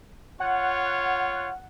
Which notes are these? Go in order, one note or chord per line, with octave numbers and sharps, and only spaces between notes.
F4 C#5 F#5